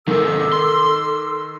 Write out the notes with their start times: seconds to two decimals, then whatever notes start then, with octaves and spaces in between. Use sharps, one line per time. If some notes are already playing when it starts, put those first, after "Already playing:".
0.07 G#2 C3 D#3 A4 D6 E6
0.52 C6